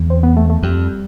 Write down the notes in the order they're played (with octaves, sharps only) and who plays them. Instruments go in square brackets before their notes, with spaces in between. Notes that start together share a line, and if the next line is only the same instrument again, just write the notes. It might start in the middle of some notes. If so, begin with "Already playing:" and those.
Already playing: [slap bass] E2
[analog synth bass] C4
B3
A3
A3
[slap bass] F2 [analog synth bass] G3